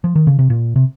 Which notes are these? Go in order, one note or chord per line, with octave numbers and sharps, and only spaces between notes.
F3
D#3
C#3
C3
A#2
C3